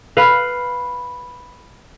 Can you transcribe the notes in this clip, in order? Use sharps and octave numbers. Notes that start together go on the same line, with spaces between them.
B4 F5